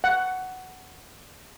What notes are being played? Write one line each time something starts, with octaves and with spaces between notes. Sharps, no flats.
F#5